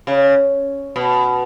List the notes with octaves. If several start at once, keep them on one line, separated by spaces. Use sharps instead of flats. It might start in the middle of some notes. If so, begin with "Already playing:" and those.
C#3
B2